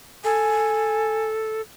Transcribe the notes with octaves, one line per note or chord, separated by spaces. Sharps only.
A4 G#5